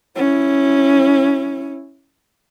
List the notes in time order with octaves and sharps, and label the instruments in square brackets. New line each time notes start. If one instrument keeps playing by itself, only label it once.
[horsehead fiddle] C#4 E4